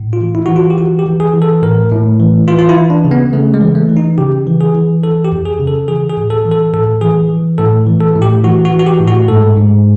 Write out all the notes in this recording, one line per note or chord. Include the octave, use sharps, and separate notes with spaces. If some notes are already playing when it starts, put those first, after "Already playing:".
Already playing: A2
F4
E3
E4
E3 F#4
F4
G4
E3 F#4
G4
E3
G#4
E3
A4
A2 A#4
A2
E3
E3 F4
F4
E4
E3
D4
C#3
B3
C#3 A3
G#3
E3
A3
E3
D#4
C#3 G4
E3
G#4
E3
E3 A4
G4
F2
G#4
C#3
A4
E3 G#4
G#4
A2
A4
E3
A4
A2 A4
E3 G#4
E3
A2 A4
E3
A4
A2
G4
E3 F#4
F#4
E3
F#4
G4
A2
F#4
G#2 A4
G#2